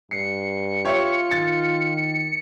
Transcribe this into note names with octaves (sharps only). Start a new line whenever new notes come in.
G2 C7 C#7
F4 G4 C#5 E5
D#3 A6